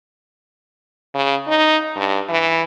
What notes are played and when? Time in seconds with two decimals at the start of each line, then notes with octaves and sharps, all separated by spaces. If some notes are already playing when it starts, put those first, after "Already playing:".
1.15 C#3
1.47 D#4
1.96 G2
2.29 E3